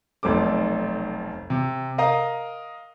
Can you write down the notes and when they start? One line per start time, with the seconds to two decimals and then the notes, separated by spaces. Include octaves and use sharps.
0.23 F1 B1 C4 A4 D6
1.50 C3
1.98 A#4 D#5 F5 A#5 D#6